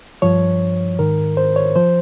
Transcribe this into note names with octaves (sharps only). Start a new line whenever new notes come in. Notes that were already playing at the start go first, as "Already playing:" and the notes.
G2 F3 C#5
G#2 D#3 A#4
C5
C#5
F3 C5